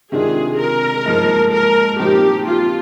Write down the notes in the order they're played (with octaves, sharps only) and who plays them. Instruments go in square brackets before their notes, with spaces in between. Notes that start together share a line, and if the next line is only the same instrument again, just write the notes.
[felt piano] C3 D#3 G#3 D4 F4 [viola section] G#4
[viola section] A#4
[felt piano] G#2 F3 A#3
[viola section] A#4
[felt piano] A#2 F3 C4 D#4 [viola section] G4
[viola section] F4